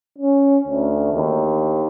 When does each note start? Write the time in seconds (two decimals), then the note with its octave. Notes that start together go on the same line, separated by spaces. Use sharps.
0.19 C#4
0.68 D2
1.14 D#2